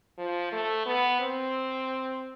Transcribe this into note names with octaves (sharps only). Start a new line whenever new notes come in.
F3
A3
B3
C4